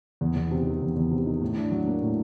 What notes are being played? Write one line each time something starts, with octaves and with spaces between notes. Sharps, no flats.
E2
E2
C3
D#3
E2
E2
C3
D#3
A2
D4
F#3
A#3
A2